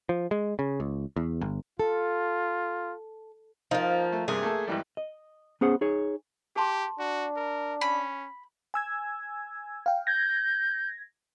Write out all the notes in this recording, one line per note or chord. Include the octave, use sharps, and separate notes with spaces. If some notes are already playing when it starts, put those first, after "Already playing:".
F3
G#3
C#3
C#2
E2
G1
F4 A4
F3 A#3 D#4
A3
G2 C3 A#3 G#4
A3 A#3 A4
G#1 E3 G3
D#5
B3 C#4 G#4 C5 F#5
D#4 G#4 C#5
G4 G#4 A5 C6
D4 F#4
A#4
C#4 B5
G#5 E6 G#6
F5 G5
G6 G#6 A#6